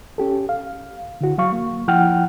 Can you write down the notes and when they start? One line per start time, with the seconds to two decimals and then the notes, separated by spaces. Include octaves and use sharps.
0.18 C#4 G4 A4
0.49 F5
1.21 D3 E4 F#4
1.38 F#3 F5 C#6
1.52 A#3
1.88 F3 E4 F#5 G5 F6